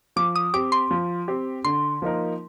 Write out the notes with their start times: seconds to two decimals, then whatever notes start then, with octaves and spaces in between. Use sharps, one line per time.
0.16 F3 D6
0.36 D#6
0.54 C4 G4 D6
0.72 C6
0.91 F3
1.28 C4 G4
1.65 D3 C6
2.02 F3 A#3 D#4 A#4